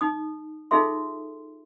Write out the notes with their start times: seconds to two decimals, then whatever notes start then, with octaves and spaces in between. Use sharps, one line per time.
0.01 D#4 D#6
0.71 D#4 F4 G#4 A4 E5 C6